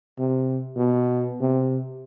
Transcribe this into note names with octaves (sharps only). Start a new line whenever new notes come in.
C3
B2
C3